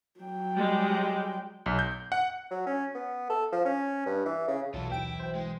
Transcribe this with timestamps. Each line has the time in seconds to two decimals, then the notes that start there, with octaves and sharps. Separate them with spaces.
0.20 F#3 G5
0.55 G3 G#3
1.66 B1
1.79 G6
2.12 F#5
2.51 F#3
2.66 C#4
2.95 B3
3.30 A4
3.52 F3
3.65 C#4
4.06 G2
4.25 E3
4.48 C#3
4.74 B1 B2 E3 F#3 F4 A4
4.90 D#2 E4 G5 D7
5.20 C5 G5
5.35 G#3